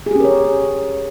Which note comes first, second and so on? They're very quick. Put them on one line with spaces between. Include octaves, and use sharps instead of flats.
G#4 G4 C#4 A#4 C#5